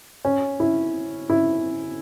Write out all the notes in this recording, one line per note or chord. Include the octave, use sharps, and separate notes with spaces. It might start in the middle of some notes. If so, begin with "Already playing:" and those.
C#4
E4
E4